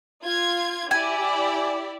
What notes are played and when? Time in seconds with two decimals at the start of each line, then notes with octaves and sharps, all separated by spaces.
0.23 F4 G#6
0.91 E4 G4 D5 G#5